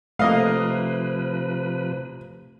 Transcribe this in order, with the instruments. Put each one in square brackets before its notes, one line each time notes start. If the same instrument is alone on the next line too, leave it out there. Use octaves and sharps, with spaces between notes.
[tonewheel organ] C3 F3 B4 [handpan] A3 [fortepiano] A#3 D#5 F5